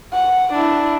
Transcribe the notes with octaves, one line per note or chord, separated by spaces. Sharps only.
F#5
D4 E4